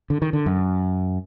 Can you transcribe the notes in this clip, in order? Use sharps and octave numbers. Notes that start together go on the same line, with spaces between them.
D3
D#3
D3
F#2